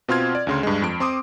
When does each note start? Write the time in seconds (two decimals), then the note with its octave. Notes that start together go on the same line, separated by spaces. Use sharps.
0.08 B2 C4 F4 C6 F6 G#6
0.35 D5
0.47 D2 C#3 C6
0.63 G2 G#3
0.82 F2 D7
1.00 C4 C6 D6 D#6